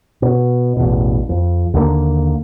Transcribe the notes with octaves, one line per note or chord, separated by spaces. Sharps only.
B2
A1 E2 B2
F2
D#2 D3 D#3 A#3